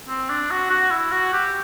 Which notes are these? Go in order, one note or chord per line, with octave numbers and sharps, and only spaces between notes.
C4
D4
F#4
F#4
E4
F#4
G4